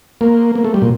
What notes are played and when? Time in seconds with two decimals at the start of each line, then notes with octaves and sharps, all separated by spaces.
0.21 A#3
0.55 A#3
0.64 A3
0.74 G3
0.82 A#2